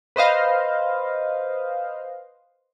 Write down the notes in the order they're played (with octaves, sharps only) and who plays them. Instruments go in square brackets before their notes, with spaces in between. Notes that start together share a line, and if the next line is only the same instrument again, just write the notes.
[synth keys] B4 C5 D#5 F5